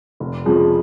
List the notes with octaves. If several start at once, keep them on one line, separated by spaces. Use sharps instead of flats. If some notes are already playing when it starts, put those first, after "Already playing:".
F1
F2 C#3 F3 G#3